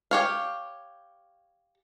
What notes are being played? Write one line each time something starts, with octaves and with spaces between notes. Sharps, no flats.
G4 C#5 F5